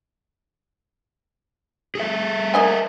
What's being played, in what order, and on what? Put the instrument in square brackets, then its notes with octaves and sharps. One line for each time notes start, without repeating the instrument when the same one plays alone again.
[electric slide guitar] G#4 A4 E5
[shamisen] A#3 D#5 G#5